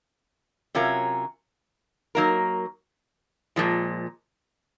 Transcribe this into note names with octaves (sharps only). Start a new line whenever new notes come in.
C3 F#3 C#4 F4 A#4
F#3 A#3 D#4 A#4
A#2 F3 G#3